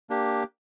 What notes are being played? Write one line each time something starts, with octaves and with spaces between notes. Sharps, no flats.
A#3 D4 G4